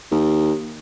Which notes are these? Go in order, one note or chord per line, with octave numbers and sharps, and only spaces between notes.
D#2